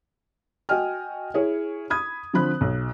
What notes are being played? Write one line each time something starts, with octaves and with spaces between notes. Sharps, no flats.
F#4 D#5 G5 G#5 F6
E4 G#4 C#5
B5 D#6 G#6
D3 F3 C4 B5 F#6
B1